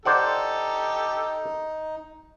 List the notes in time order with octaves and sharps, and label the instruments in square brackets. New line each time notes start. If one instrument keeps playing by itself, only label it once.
[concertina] D#4 [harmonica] G4 A4 [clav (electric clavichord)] C5 D5 F#5